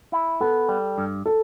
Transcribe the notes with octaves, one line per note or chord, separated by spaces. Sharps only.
E4
B3 A4
G3
G2
A4